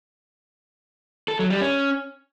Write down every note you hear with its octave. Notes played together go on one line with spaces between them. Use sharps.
A4
F#3
G3
C#4